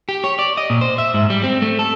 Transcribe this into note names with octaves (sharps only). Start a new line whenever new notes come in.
G4
C#5
D5
D#5
A#2
C5
E5
G#2
G3
C4
A3
A4